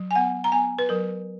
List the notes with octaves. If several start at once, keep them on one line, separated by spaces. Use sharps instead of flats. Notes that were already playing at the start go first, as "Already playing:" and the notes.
Already playing: F#3
G#5
B3 F#5
A#5
B3 G#5
B4
F#3 A#4